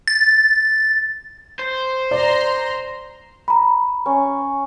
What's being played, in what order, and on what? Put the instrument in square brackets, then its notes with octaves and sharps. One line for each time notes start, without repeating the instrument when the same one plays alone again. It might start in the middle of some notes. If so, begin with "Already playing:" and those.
[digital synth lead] A6
[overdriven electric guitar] C5
[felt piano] D5 [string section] A#5 C6
[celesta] A#5 B5
[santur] C#4